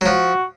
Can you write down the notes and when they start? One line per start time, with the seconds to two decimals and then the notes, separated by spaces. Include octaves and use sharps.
0.01 F#3
0.06 F3 F#4